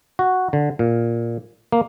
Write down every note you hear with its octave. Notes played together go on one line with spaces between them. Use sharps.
F#4
D3
A#2
A#3